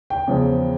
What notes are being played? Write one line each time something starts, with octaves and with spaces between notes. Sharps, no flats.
G5
E2 C#3 F3